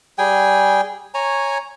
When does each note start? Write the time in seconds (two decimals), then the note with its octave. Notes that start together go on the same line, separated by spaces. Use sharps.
0.18 G3 G#4 G5 G#5
1.14 C#5 G#5 A#5